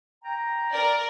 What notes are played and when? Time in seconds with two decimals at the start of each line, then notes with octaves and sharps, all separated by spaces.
0.24 G5 A#5
0.72 A#4 D5